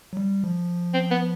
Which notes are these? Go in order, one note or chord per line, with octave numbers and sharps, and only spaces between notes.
F#3
G3
F3
C4
B3